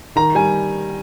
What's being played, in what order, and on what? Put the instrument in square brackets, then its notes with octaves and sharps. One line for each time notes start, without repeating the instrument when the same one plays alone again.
[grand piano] D#3 A#5
G3 G#5